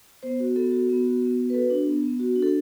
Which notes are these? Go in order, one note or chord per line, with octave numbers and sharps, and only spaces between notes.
B3 C5
F#4
B3 A4
F#4
B3
F#4
B3
F#4
B4
F#4 A4
D4
B3
B3
F#4
D4
A4